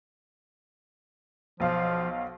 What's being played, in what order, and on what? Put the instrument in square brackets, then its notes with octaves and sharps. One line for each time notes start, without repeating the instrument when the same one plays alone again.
[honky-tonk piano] B1 F5 [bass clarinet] F3